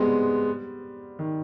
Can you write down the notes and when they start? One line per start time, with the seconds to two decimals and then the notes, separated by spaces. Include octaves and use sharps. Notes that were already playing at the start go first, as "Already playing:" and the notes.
Already playing: G3 G#3 B3 C4
1.19 D#3